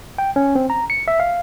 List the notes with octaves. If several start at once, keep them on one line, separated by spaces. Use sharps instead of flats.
G5
C#4
C4
A#5
C#7
E5
F5